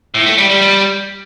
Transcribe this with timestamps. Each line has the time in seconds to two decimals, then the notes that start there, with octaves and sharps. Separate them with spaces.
0.14 A2
0.26 A3
0.38 G3
0.50 G3
0.61 G3